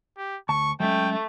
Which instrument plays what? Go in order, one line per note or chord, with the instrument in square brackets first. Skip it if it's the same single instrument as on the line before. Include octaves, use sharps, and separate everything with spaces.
[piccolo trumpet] G4
[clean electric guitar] D2 A5 [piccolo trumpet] C#6
[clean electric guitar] F#3 G#3 C#4 [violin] A3 [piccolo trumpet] G5